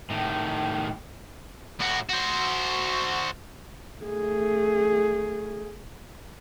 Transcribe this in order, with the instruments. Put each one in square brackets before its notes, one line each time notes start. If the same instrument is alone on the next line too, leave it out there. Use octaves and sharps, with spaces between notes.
[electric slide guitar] A2 D#3
[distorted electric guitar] A2 F#4
F#4 C5
[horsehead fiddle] A3 G#4